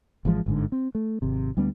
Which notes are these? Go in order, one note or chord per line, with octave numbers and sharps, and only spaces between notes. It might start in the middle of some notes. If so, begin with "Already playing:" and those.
G#1 E3 F3 G#3
G1 G#2 D3
C4
A3
G#1 C3
D2 G3 B3 D4